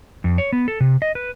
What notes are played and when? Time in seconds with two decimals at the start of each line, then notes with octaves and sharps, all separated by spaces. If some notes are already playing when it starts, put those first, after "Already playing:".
0.24 F2
0.38 C#5
0.53 B3
0.68 A4
0.80 C3
1.02 D#5
1.15 B4